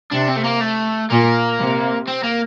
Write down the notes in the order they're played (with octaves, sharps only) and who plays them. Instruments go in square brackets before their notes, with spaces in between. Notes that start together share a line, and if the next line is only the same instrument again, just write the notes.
[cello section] C3 [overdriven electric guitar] D4
[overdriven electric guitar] C4
A3
A#3
A3
[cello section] A#2 [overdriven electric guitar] A#3
[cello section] C3
[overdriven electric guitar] C4
A#3